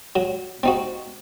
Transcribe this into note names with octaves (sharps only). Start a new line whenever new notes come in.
F#3
C4 D#4 F#4